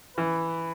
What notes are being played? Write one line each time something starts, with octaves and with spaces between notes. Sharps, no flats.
E3 B4